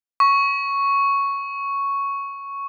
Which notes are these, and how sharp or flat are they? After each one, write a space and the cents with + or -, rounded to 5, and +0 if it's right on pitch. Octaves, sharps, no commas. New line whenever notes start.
C#6 +0